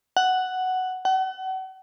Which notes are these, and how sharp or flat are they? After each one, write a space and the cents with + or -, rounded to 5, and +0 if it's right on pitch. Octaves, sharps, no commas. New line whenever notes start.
F#5 +5
F#5 +35